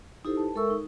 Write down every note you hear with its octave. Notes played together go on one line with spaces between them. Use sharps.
D#4 E4 G4 A4 C5
B4 A5
G#3 A4 A#4 E5 C#6 E6
D#4